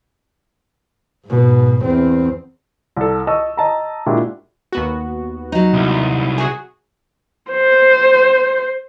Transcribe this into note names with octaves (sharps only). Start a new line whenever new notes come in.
G#2 B2
E2 C4
C2 A4
D#5 A5 C#6 E6
D#5 A5 A#5
A#2 G#3 D4 E4 F#4 G4
D#2 B3 F#4
F#3 D#4
C2
F#4 G#4
C5